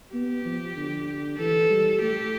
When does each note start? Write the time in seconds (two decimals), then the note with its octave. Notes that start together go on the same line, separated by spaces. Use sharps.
0.14 B3 G4
0.45 F3
0.77 D3
1.39 E3 A4
1.70 G3
2.02 A3 G4